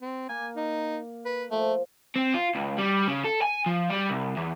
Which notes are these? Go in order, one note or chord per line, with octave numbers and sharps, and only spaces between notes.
C4
A#3 G#5
D#4
B4
F3 A3
C4
F4
C#2
G3
C#3
A4
G#5
F3
G3
C2
E2